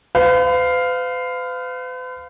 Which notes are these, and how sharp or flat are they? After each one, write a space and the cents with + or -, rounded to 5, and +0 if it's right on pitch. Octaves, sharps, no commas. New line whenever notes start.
B4 +45 F5 +0